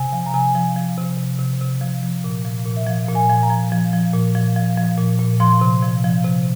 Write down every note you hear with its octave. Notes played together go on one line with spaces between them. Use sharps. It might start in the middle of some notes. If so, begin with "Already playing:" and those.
Already playing: C3 G#5
F3
A#5
C3 G#5
F3
F3
C3
C3
C3
C3
F3
F3
A#2
F3
A#2
E5
F3 F5
A#2
G#5
F3
A#5
F3
F3
F3
A#2
F3
F3
F3
A#2
A#2
F3 C6
C3
F3
F3
C3